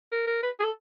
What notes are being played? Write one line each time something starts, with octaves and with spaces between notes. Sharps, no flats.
A#4
A#4
B4
G#4
A4